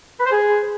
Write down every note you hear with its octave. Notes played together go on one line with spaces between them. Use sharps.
B4
C5
G#4